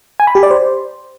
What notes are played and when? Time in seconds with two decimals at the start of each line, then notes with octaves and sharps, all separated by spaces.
0.20 G#5
0.27 B5
0.35 G4
0.43 D5
0.51 C5